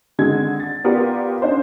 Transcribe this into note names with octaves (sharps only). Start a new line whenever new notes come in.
D3 D#3 G#3 C4 G#6
A6
B3 F4 G4 A#4 D5
C#4 D4 C5